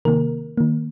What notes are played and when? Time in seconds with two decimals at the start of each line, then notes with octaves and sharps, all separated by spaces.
0.05 C3 D#3 A#3 A#4
0.57 D#3 A#3